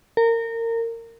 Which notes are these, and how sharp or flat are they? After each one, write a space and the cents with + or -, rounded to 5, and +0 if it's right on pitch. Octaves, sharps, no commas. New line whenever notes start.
A#4 -25